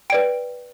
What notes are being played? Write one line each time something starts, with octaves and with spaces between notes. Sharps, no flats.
B4 D5 G5 D7